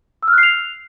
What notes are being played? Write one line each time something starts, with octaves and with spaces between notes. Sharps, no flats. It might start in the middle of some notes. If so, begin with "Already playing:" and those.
E6
F6
F#6
C7
F7